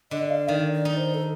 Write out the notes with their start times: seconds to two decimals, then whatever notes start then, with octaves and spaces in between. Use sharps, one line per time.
0.11 D3 D#5
0.30 F5
0.48 D#3 D5
0.73 D5
0.85 D#4
0.97 C5
1.14 A4